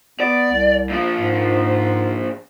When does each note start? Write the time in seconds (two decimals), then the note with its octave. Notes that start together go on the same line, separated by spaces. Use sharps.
0.20 B3 D5
0.52 C2
0.90 A#2 F3
1.19 G#2